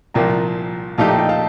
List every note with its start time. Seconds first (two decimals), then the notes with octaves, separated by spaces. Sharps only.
0.14 C2 A#2 F3 A#3 G5 A#5
0.98 A#2 F3 A3 D#4 G4 F5 A5
1.08 G5 A#5
1.18 D#5 G5
1.29 F5 A5